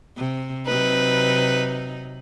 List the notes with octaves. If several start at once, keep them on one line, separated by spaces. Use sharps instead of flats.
C3
C3 F#3 D#4 B4